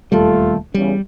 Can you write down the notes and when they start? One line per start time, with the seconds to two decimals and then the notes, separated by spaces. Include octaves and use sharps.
0.12 E1 D#2 G3 A3 F4 A4
0.74 E2 C#3 G3